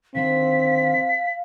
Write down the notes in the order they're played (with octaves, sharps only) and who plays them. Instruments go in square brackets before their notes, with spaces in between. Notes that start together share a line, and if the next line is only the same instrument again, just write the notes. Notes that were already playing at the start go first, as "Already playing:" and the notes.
[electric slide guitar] D3 D#3 C5 [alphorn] C4 [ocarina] F5 [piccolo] B6